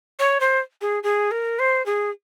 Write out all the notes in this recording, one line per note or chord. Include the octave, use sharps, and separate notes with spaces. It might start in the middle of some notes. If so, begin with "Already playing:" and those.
C#5
C5
G#4
G#4
A#4
C5
G#4